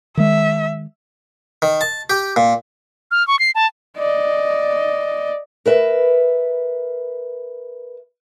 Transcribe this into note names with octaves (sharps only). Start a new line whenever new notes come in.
D#3 G#3 E5
D#3
A5
G4
A#2
F6
C#6
C7
A5
D5 D#5
A#4 B4 E5